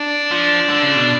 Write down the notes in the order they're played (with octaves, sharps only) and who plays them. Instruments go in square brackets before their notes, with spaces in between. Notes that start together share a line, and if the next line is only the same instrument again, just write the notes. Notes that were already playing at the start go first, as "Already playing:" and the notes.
Already playing: [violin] D4
[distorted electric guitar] F3
D3
C#3
B2